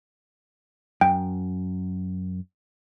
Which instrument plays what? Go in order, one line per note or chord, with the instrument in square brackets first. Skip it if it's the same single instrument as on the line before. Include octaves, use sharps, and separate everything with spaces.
[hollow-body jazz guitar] F#2 [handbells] G5